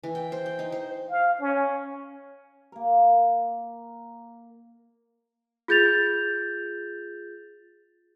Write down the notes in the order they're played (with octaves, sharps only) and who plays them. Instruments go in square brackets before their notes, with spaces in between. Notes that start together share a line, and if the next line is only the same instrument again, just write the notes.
[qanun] E3
G5
C5
G5
D#4
C5
[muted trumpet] F5
C#4
[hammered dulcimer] A#3 A#4
[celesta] F4 G#4 G6 A6 F7